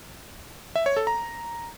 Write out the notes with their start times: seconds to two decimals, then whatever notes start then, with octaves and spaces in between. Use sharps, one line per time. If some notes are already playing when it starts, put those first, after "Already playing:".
0.76 E5
0.86 C#5
0.97 A4
1.07 A#5